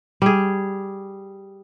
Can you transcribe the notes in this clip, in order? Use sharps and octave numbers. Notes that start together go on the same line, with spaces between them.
G3 G#4